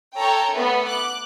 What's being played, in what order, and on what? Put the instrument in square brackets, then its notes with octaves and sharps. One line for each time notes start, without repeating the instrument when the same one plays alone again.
[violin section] A4 C#5 G5 A#5 C#6
A3 B3
D6 F#6